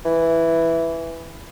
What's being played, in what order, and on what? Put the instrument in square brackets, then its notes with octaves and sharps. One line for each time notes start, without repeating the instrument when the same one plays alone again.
[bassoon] E3